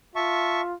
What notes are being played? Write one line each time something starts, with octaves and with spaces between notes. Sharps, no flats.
F4 E5 A5 C#6